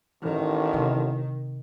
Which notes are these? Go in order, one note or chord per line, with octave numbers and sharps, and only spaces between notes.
A1 D#3
C3